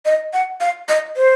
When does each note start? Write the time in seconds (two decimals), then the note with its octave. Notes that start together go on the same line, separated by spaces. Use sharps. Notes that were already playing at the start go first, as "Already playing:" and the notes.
0.05 D#5
0.33 F#5
0.61 F5
0.89 D#5
1.16 C5